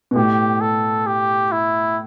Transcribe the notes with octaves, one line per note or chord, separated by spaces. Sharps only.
B2
A2 G4
A4
G4
E4